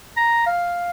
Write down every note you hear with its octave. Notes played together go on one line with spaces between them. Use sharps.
A#5
F5